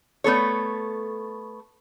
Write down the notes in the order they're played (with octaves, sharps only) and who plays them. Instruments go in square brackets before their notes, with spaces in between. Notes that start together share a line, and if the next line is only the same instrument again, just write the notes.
[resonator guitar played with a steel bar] A3 B3 A4 C#5